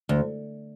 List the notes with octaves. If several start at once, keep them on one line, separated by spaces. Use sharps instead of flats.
D2